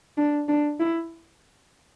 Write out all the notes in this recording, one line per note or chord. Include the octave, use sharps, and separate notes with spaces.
D4
D4
E4